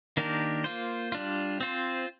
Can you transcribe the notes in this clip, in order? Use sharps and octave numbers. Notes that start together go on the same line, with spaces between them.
D#3 A#3 D4 G4 A#4
A#3 F4 C5
G3 D4 F4
C4 F4 C5